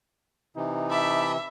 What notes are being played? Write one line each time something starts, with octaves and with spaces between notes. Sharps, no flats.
C3 E3 D#4
E5 A5 B5 D6